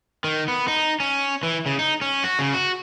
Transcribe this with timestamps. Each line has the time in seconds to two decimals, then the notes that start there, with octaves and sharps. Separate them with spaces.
0.24 D#3
0.48 B3
0.68 D#4
1.00 C#4
1.43 E3
1.66 C#3
1.79 D#4
2.01 C#4
2.24 F#4
2.39 C#3
2.54 F#4